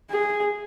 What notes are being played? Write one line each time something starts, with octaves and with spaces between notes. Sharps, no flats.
G#4